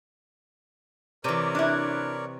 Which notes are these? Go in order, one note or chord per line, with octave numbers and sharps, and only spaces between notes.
C3 E3 A#4 C#5 D5
D4 E4